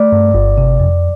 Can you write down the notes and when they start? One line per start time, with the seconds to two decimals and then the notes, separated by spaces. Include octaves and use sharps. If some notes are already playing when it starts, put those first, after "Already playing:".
Already playing: A3 D5
0.12 G2
0.34 G1
0.57 C3
0.80 F2